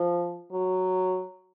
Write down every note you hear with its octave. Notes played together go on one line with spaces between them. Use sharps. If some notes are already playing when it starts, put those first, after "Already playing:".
Already playing: F3
F#3